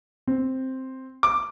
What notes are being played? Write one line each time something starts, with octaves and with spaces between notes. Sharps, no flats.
C4
D6